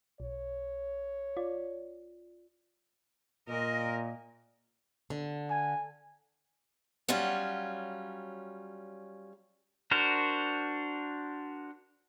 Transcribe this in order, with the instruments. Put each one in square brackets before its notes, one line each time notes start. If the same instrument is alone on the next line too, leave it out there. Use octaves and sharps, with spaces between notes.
[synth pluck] B1 [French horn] C#5
[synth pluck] F4 D5
[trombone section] A#2 [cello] A#4 D#5
[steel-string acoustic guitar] D3
[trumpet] G#5
[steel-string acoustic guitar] F#3 G3 C#4 F4
[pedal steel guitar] D4 F#4 A#4 C5